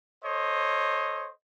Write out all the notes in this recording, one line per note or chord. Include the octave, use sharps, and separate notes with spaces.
A4 C5 C#5 D#5